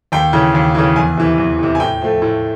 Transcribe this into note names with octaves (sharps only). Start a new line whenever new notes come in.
D#2 G5
C#3 E3
D#2
C#3 E3
E2 G#5
C3 E3
E2
C3 E3
G#5
A2 G5
F3 A3
A2